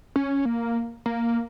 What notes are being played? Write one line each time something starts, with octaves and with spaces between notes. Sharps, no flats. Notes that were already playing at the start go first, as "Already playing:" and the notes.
C#4
A#3
A#3